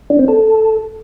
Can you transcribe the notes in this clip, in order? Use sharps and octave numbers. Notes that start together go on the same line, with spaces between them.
D4
C4
A4